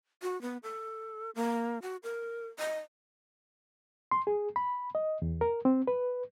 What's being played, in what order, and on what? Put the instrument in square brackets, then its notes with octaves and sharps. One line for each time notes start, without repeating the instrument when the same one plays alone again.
[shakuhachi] F#4
B3
A4
A#3
F#4
A#4
D#5
[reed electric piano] C6
G#4
B5
D#5
E2
A#4
C4
B4